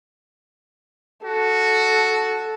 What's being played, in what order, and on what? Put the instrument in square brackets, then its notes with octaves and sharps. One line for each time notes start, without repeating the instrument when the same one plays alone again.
[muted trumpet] F#4 [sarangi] A4